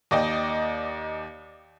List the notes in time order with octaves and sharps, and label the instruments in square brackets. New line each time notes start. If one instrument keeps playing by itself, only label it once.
[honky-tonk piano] D#2 D5 D#5 G5